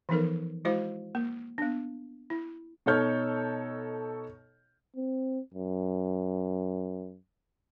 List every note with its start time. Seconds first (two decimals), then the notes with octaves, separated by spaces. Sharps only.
0.09 E3 F3 B3 D#4 A4 A#4
0.65 G#3 E4 F#4 C5 F5
1.15 A#3
1.58 B3 D4
2.30 E4
2.86 B2 D#4 A4 C#5 F6 G6
4.96 C4
5.54 F#2